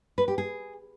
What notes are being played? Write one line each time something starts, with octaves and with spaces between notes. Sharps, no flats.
B4
G4
G#4